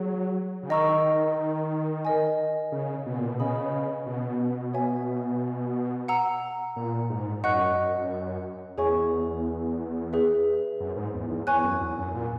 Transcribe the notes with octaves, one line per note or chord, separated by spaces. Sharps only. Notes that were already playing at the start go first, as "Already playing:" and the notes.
Already playing: F#3 G#4
C#3
D#3 D#5 A#5 C#6 E6
A#4 D#5 G#5
C#3
B2
A#2
B2
C#3 B4 D#5 G#5 B5 D#6
B2
C#5 E5 G#5
F#5 A#5 E6
A#2
G#2
F#2 D#5 F#5 C#6 F#6
E2 G#4 C#5 E5 G#5 C#6
G#4 B4 E5
F#2
G#2
E2
E2
E2 C#5 G#5 C#6 F#6
F#2
E2
F#2
A#2